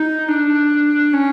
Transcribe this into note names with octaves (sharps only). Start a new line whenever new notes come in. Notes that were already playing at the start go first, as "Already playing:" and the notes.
Already playing: D#4
D4
C#4